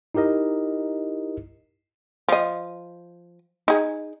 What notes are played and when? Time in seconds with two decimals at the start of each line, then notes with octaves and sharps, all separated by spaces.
0.15 D#4 E4 G4 A#4 D#5
2.28 F3 D#5
3.68 D#4 G#4